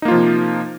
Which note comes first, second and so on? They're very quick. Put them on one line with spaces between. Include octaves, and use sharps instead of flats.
D#4 A#3 F4 F3 C3